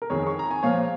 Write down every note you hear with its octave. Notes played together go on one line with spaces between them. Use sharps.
A#4
F2 D#3 G#4 C#5
C#6
A#5
G#5
A#2 F3 C#5 F5